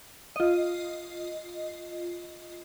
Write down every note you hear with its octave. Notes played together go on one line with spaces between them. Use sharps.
F4 D#5